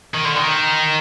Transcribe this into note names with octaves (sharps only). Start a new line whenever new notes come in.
D#3
D3
D#3